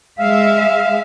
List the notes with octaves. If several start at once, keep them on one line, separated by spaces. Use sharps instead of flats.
G#3 E5 F5